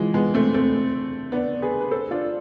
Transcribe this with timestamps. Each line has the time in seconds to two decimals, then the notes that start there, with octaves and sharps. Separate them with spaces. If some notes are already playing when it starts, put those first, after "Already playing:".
Already playing: E3 F3 G#3
0.14 G#3 B3
0.34 A3 C4
0.54 A3 C4
1.32 B3 D4
1.62 G#4 B4
1.81 B4
1.91 A4 C5
2.11 D4 F4